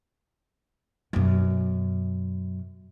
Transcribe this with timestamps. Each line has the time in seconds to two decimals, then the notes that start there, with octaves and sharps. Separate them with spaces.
1.13 F#2 B2